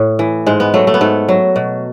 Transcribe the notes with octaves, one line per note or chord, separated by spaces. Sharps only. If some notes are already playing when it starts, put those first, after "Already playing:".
Already playing: A2
E3
G#2 G#3
B3
F#3 A3
A3
B3
G#2 A3
F#3
B2